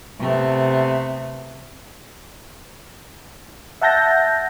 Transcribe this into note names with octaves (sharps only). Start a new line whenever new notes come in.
C3 A3 B3
E5 F#5 A5 G6 A#6